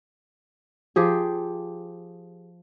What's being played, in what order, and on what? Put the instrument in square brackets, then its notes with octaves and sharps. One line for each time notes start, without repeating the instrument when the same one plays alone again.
[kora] F3 G4 G#4